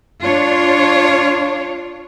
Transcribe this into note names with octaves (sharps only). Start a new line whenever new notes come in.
D4 F4 C#5